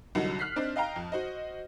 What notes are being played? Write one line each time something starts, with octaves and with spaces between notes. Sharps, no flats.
C2 D3 F#3 D#4 F#5
F6 F#6 B6 C7
C4 D4 D#4 C5
D#5 F5 G5 A#5
F2
F#4 C5 D#5